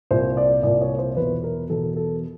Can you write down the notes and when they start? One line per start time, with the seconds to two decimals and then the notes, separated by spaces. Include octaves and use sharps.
0.11 C2 A#2 C5
0.37 D5
0.63 C2 A#2 D5
0.82 C#5
0.99 C5
1.16 E2 B2 B4
1.44 A#4
1.70 E2 B2 A4
1.96 A4